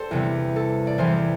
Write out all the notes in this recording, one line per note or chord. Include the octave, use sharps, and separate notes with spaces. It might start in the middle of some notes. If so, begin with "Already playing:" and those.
Already playing: G4 A4 C5 D5
E2 C3 G3
A4
D5
E2 E3 G3 C5